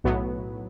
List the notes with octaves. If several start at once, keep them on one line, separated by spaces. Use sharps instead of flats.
B1 A2 F#3 B3